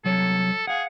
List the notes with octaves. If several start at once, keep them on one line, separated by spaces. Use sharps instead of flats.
C2 F#3 A4 C#5
G#4 F5 F#5